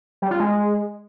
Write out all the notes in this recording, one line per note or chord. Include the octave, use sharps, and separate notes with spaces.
G3
F4
G#3